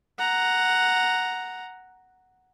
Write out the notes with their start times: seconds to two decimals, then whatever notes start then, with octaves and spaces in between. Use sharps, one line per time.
0.18 F#5 A#5